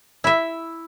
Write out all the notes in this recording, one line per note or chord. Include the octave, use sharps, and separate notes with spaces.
E4 E5